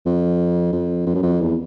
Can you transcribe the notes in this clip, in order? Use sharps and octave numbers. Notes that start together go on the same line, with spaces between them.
F2
F2
F2
F#2
F2
E2